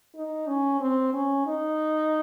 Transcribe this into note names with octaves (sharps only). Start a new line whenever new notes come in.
D#4
C#4
C4
C#4
D#4